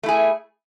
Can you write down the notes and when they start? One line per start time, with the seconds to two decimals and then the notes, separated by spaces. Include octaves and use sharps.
0.03 A3
0.06 E4
0.08 G#4